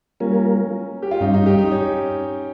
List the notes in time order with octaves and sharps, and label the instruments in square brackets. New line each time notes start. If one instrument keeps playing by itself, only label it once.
[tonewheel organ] G3 A#3 F4 A#4 [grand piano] C#4
[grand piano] G4
F4
[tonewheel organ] G2 G3 C#4 [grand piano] D#4
[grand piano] D#4
G4
D#4
C#4